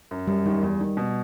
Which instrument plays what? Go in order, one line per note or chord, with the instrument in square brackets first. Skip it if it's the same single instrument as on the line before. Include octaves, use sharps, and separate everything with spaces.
[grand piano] F#2
[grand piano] F#2 [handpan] G3
[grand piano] D#3 [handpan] G3
[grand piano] E2
D#3
B2